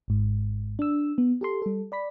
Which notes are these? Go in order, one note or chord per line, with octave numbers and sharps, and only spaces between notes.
G#1 G#2
D4 E6
B3
G4 A4 C6
G3 A4
D5 B5 B6